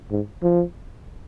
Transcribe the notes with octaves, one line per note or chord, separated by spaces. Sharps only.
G#2
F3